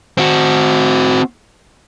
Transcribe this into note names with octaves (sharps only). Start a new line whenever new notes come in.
C4 F#4